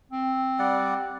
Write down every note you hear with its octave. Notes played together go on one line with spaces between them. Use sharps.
C4
G3 D5 F#5